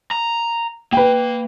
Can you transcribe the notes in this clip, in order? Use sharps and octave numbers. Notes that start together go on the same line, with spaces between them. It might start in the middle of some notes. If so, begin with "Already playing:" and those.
A#5
A#3 B4 G5